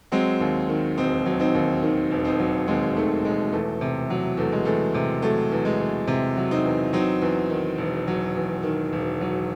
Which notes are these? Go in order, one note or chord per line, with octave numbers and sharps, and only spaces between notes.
F#3 G#3 C4
D#2
D#3
E1 C4 D#4
F#3
C4 D#4
D#2
D#3
E1
C4 D#4
F#3
D#2 G#3 C4
D#3 A3
E1 G#3
E2 A3
C3
F#3
E2 A3
G#3
E2 A3
C3
F#3 A3
E2
G#3
E2
C3
F#3
C4 D#4
E2
F#3 C4 D#4
E2
D#3
E1
F#3
E2
D#3
E1
F#3